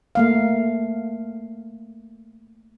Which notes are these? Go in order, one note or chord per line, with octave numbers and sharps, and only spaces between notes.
A3 A#3 F5